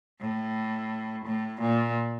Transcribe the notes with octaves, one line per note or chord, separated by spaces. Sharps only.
A2
A2
A#2